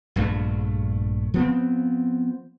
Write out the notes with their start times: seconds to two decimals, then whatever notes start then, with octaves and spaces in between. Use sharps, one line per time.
0.16 A#1 G2 A3
1.34 F3 B3 C4